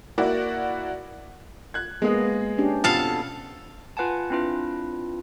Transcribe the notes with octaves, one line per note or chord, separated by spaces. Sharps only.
A#3 E4 F#4 D5
F#6 G#6
G#3 A#3 B3 G#4 D#5
C#4 D4 G4
F2 B2 A4 F5
F4 B4 F#5 G#5 A5
C4 D4 E4 F4 B4